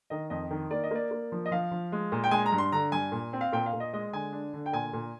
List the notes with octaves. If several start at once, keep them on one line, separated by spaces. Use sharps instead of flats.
D#3 D#5
F2 D#5
D#3
A#3 D5
D#5
A#3 D5
A#3
F3
D#5
F3 F5
F3
G#3
A#2
G5
G#3 G#5
A#5
G2
C6
D3 A#5
G2 G#5
A#2
C4
F5
A#2 G5
F5
A#2
D#5
G#3 D#5
D3 G#5
D4
D3
G5
A#2 G#5
A#2